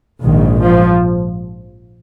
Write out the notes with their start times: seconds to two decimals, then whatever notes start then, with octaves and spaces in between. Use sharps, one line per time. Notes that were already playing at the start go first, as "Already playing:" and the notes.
0.22 A#1 G#2 D#3
0.59 F3